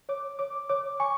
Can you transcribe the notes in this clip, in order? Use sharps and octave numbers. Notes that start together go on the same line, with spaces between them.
C#5 D6
C#5 D6
C#5 D6
G#5 C#6